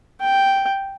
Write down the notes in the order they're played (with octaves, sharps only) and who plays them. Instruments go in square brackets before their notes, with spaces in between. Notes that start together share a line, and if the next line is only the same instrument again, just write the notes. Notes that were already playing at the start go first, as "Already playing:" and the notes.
[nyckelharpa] G5